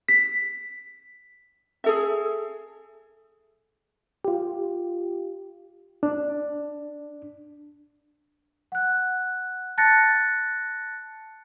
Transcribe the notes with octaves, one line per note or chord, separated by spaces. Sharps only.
B6
G#4 A4 E5
F4 G4
D4
F#5 F#6
A5 F#6 A6 A#6 C#7